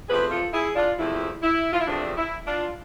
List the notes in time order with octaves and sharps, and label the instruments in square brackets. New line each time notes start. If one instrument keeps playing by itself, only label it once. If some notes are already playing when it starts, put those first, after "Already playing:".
[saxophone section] E2 C3 F3 A3 C4 G#4 B4
F4 A4
E4 G#4
D4 F4
E2 C3 F3 A3 C4 E4
E4
F4
E4
E2 C3 F3 A3 C4 D4
E4
D4 F4